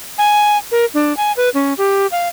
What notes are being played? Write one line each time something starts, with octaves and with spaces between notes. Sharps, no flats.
G#5
A#4
D4
G#5
B4
C#4
G4
F5